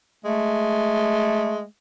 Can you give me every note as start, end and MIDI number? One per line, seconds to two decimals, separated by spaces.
0.25 1.64 56
0.25 1.64 57